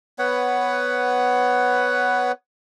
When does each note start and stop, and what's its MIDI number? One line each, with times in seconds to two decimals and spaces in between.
0.19 2.32 59
0.19 2.32 71
0.19 2.32 73
0.19 2.32 78